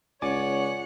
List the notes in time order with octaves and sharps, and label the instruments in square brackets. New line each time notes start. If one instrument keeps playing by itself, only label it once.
[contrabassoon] C#2 [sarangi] C#5 [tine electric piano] D5 G#5 D6 [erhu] F#5